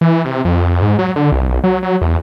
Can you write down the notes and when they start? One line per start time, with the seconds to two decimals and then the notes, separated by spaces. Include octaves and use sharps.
0.01 E3
0.25 C3
0.45 F2
0.82 G#2
0.99 F#3
1.16 D3
1.32 C2
1.48 B1
1.64 F#3
1.83 F#3
2.01 E2